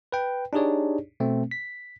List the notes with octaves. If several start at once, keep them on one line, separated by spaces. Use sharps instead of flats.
B4 G5
D4 D#4 G4 G#4 C#5 D5
B2 A3 C4
B6